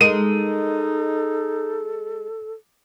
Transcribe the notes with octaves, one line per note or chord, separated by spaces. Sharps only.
G#3 D#4 A4 A#4 D#7